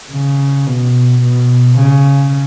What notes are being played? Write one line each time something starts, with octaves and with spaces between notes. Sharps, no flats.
C#3
B2
B2
C#3